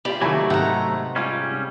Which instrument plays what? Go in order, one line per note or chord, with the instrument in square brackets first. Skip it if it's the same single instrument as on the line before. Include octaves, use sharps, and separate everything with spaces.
[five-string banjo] E3 G3 F4 [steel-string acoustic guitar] G4 D5
[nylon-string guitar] C3 D#3 [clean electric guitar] F#3 A3 [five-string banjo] A#3 E4 G#5
[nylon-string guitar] G#2 C3 [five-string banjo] B3 E5 G5 [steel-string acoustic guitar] F#5 A#5
[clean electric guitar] G3 C#4 [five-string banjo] G#3 F4